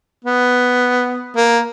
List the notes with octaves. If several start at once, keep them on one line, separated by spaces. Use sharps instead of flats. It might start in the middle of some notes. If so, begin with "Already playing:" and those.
B3
A#3